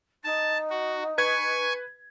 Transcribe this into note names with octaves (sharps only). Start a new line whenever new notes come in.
D#4 A5
F#4
B4 G#5 C#6 G#6